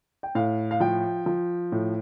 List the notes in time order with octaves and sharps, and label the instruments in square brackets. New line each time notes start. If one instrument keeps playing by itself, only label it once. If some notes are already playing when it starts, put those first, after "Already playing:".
[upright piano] G5
A2 F5
F5
F3 G5
F3
A2